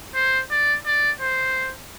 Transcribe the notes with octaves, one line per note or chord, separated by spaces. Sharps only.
C5
D5
D5
C5